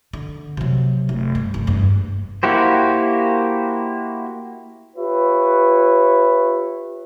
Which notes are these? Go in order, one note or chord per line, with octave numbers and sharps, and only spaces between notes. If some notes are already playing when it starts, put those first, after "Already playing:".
D3
C3 F#3
F1
G2
F1
E2 G2
A#3 E4 F#4 G4 C5
F4 G4 B4 C#5 E5